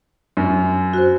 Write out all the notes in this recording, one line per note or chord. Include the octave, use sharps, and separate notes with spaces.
F#2
F#4 C5